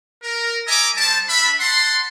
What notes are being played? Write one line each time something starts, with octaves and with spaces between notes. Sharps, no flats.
A#4
D#5 E5 G#5 A#5 D6
G3 C5 A5
D4 E5 B5
F#5 A5 C6